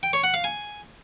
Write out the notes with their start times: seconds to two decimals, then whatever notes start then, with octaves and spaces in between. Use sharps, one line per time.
0.03 G5
0.13 C#5
0.24 F#5
0.34 F5
0.44 G#5